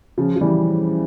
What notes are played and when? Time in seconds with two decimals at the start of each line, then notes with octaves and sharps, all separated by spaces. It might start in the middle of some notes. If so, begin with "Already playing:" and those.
0.18 C#3 F3
0.36 F3
0.41 E3 G3